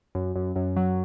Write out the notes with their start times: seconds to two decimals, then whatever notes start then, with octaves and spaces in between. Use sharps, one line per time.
0.15 F#2
0.36 F#2
0.56 F#2
0.76 F#3